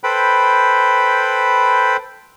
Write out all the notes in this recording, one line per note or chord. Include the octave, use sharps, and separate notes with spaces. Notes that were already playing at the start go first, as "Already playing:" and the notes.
A4 B4 C5 G5 B5